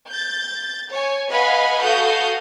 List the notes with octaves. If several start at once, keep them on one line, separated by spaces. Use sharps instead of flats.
G6 A6
C#5 G#5
B4 D#5 F5 F#5 G#5 B5
F#4 A4 F5 D#6 G6